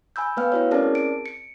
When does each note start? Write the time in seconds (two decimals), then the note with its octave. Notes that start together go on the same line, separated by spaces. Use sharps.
0.16 G#5 B5 E6 G6
0.37 A3 B3 B4 F5 G5 F6
0.52 E4 F#4 C#5
0.71 C4 C#4 G#4 A#4 D5 A5
0.95 D7
1.26 C#7